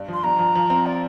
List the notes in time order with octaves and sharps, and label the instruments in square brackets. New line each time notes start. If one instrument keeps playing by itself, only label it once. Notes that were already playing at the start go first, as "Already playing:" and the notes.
Already playing: [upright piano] G2
[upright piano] F3 [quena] C6
[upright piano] G2 [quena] A#5
[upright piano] F3
F3
C4
[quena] D5